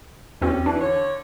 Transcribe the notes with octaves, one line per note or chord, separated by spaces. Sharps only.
E2 G3 C4 C#4 F#4
E3 D4
D3 C#5